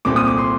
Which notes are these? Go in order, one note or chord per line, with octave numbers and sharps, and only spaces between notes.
C2 A#2 A3 C4 D6
D#6
D6
C6